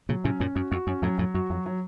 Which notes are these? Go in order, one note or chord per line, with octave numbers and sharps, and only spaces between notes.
A#2 C#3 F#3
A2 C3 C#4
F#2 A#2 C#4
F#2 F#4
F2 F#4
F#2 C#4
F2 A2 F#3
F2 A2 F#3
F#2 F#4
F2 F#3
F#3